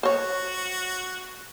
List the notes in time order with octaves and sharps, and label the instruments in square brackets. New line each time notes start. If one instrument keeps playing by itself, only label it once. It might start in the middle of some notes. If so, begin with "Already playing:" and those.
[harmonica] F#4 [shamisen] C5 C#5